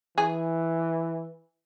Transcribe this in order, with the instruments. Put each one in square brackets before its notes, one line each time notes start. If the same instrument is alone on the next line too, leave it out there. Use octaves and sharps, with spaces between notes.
[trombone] E3 [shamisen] G#4